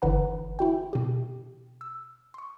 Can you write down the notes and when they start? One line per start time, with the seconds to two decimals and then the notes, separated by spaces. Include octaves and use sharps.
0.02 G1 D3 E3 B4 F#5 A#5
0.59 E4 F#4 G5
0.93 B2 G4
1.81 E6
2.34 C6 C#6